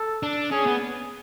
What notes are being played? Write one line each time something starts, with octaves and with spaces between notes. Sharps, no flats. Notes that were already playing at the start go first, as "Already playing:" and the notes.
Already playing: A4
D4
C#4 G#4
B3